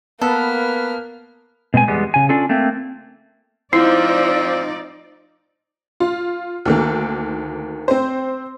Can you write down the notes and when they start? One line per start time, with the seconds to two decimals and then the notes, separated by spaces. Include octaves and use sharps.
0.21 A#3 B3 A4 B4 F6
1.74 B2 G#3 C4 G#5
1.88 E2 G3 G#3 B3
2.14 C#3 G#5
2.29 C#4 D4 F4 A4
2.49 A3 A#3 C4
3.73 F3 C4 D#4 E4 D5
6.00 F4
6.66 D2 D#3 A#3
7.88 C4 C5